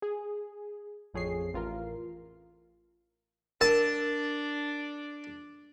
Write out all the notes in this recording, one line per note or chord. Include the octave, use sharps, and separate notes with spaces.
G#4
A1 F2 G#4 C#5 C7
A1 F4 A#4
D4 A#4 D5 A5